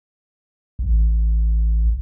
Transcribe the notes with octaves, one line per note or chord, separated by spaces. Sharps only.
A1